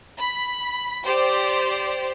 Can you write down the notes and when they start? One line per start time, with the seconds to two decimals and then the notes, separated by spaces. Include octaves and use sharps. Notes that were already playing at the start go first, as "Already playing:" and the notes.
0.17 B5
1.04 G4 C5 D5